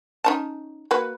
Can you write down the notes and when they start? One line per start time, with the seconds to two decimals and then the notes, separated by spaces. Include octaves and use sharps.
0.24 C#4 D#4 A5
0.91 A#3 F#4 B4